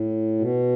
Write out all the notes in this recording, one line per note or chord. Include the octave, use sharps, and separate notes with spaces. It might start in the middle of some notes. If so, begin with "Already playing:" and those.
Already playing: A2
B2